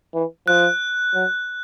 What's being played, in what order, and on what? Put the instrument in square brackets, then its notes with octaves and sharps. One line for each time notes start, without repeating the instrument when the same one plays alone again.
[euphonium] E3
[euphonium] F3 [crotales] F#6
[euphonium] F#3